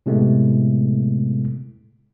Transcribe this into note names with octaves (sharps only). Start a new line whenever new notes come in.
A2 C3 G#3 A3 B3